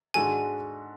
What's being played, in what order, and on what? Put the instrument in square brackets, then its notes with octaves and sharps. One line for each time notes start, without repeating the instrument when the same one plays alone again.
[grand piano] G#2 G#3 D4 F#4 A4 [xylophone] G#5